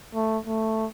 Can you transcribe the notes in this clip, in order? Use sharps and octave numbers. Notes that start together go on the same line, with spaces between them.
A3
A3